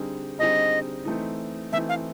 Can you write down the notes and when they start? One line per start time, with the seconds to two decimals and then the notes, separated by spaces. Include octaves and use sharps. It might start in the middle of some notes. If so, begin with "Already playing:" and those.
Already playing: D3 G3 C4 D#4 G#4
0.39 D3 G3 C4 D#4 G#4 D#5
1.05 E3 A3 C4 D#4
1.73 E3 A3 C4 D#4 E5
1.89 F5